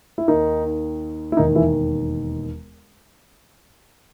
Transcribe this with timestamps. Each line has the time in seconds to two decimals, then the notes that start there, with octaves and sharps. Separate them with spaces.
0.18 E4
0.28 D#2 D#3 D#4
1.32 E4
1.37 E1 D#2 D#3 D#4
1.56 E3 E4